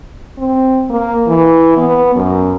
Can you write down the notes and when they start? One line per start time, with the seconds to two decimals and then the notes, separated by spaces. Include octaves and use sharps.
0.38 C4
0.90 A#3
1.27 E3
1.77 B3
2.16 F#2